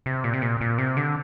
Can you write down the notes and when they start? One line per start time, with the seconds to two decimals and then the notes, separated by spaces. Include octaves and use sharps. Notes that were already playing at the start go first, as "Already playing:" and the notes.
0.06 C3
0.24 A#2
0.34 C3
0.42 A#2
0.61 A#2
0.78 C3
0.97 D3